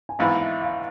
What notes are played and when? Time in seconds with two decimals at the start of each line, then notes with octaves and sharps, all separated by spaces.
0.09 G#5
0.19 G#1 G#2 E3 B3 E4 F5
0.40 E5
0.62 F5